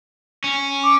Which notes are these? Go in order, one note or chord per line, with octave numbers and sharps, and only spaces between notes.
C#4
D6